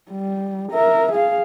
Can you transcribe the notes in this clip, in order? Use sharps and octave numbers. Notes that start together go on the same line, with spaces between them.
G3
A#4 E5
G#4 F5